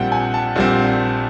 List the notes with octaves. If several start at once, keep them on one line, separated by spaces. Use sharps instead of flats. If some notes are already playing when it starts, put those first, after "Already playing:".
Already playing: A#1 A#2 G3 C4 F#5 G5
G#5
A5
A#1 A#2 G3 C4